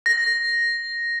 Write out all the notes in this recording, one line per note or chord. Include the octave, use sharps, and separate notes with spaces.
A#6